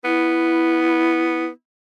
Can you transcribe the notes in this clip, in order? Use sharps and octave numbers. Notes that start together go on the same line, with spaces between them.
B3 E4